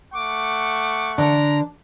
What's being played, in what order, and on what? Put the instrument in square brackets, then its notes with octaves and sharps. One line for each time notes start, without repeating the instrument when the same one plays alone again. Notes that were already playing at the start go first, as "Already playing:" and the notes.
[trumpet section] A3 F#5 C#6 [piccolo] D6
[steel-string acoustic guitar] D3 A#4 [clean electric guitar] D4 [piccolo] A#5